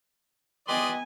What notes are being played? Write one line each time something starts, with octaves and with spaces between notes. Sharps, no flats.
B3 G4 B4 D5 D#5 G#5 C6 D#6